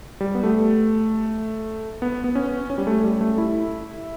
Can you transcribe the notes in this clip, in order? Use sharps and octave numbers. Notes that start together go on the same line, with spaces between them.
G3
B3
A3
B3
B3
C#4
C#4
G3
A3
G3
A3
E4